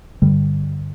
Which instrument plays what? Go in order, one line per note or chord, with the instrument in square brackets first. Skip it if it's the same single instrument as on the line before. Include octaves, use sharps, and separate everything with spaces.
[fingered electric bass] G2 D3 G3